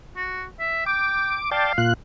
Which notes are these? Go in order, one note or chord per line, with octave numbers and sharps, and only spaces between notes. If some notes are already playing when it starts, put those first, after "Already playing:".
F#4
E5
G5 D6
D5 F5 G5 A5
A#2 F4 F#6